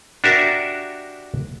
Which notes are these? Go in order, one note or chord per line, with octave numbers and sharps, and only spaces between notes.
D4 F#4 G4 A#4 E5